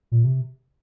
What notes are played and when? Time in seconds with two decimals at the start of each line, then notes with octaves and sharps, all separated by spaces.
0.12 A#2
0.24 C3